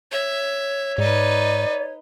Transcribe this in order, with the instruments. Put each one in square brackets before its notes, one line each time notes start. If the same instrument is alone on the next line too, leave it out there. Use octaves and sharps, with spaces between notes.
[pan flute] C#5 [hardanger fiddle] E5
[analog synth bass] G#2 [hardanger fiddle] D#4 B4 [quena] D5